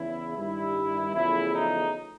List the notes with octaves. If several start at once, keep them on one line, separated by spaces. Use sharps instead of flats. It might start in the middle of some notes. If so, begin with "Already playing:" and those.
Already playing: E2 C#3 E3 E4
G2 D#3 G3 E4
E2 C#3 F3 A3 E4
D#4